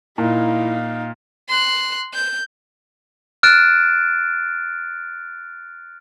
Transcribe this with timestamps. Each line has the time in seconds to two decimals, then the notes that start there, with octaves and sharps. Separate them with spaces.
0.18 A#2 D#4 E4 F5
1.49 C6 F#6
2.14 G6
3.43 F6 F#6 A6 D7 E7